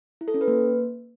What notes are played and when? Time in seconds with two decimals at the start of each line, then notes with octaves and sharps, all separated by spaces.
0.21 E4
0.28 A4
0.34 C#4
0.41 B4
0.48 A#3